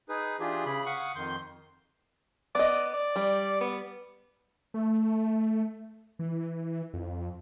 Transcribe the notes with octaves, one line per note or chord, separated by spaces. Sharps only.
D#4 G#4 B4
E3 D4 F4 G4 G#4
C#3 G#4 B5
F5 F#5 C#6 D#6
F2 D#3 C6 G6
B3 D5 D#5
D5
G3
B3
A3
E3
F2